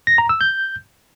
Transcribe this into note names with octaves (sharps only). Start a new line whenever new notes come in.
A#6
A#5
E6
G6